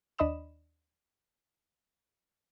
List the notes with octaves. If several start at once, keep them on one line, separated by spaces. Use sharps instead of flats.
D#2 D4 D#5 B5 D#6 E7